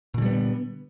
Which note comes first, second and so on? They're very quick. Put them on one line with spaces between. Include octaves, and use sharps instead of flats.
A#2 D3 G3 B3